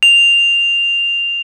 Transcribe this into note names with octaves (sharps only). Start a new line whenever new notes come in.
F7